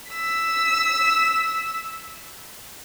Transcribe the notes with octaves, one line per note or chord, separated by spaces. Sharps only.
E6 B6